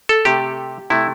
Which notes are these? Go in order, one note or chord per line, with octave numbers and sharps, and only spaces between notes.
A4
C3 A3 G4
C3 A3 E4